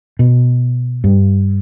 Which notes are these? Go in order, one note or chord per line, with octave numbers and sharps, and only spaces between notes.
B2
G2